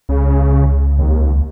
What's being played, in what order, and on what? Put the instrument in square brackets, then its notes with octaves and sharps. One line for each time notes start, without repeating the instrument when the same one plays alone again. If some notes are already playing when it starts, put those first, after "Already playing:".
[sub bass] C#2 [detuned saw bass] C#3
[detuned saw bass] D#2